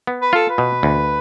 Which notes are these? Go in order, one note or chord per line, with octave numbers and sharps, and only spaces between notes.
B3
B4
F4 A4
B4
B2
D2